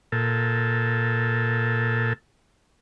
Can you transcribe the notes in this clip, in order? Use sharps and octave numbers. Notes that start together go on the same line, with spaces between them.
A#2 A4